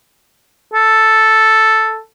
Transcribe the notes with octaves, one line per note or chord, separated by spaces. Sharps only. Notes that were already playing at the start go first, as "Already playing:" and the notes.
A4